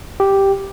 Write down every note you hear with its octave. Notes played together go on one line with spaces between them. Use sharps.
G4